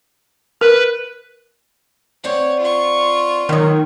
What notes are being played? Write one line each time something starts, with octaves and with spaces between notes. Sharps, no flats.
A#4 B4
C4 C#5 D5 F#5
F4 C#6
D#3 F#3 A#3